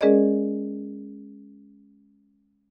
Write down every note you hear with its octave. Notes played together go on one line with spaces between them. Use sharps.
G#3 C#4 G#4 A#4 D5 D#5